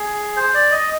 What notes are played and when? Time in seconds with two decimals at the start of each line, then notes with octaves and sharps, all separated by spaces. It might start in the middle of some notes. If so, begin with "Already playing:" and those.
Already playing: G#4
0.36 C5
0.55 D5
0.71 D#5